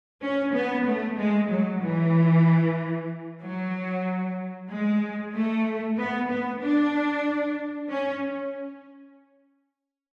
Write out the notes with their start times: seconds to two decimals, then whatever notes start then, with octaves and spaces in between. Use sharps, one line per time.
0.22 C#4
0.54 B3
0.86 A3
1.18 G#3
1.49 F#3
1.82 E3
3.42 F#3
4.69 G#3
5.33 A3
5.98 B3
6.29 B3
6.62 D4
7.90 C#4